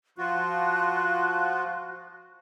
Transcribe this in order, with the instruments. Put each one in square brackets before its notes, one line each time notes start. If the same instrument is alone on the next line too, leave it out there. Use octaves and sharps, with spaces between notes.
[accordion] F3 F4 F#4 [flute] F#6